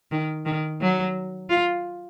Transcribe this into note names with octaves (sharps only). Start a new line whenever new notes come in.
D#3
D#3
F#3
F4